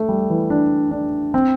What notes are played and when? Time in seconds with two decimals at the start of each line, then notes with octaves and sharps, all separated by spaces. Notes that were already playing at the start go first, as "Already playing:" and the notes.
Already playing: A3
0.09 G3
0.30 E3
0.50 D4
0.91 D4
1.34 C4